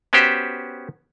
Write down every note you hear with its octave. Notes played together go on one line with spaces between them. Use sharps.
B3 C#4 F#4 G4 C5